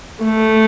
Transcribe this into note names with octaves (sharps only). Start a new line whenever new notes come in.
A3